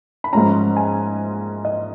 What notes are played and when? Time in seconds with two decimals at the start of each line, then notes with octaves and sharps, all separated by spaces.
0.24 B5
0.33 G#2 F3 G#3 C#4 A#5
0.76 G#5
1.65 D#5